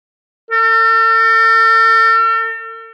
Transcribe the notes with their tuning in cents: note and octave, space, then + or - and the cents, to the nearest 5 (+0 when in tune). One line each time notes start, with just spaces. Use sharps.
A4 +45